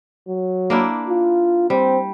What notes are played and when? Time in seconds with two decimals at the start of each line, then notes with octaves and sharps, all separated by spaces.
0.28 F#3
0.70 A#3 D4 E4
1.08 F4
1.70 G3 C4